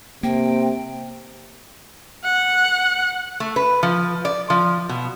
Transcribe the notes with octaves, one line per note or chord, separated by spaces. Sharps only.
C3 A#3 G5
F#5
A3
B4
F3
D5
F3
B2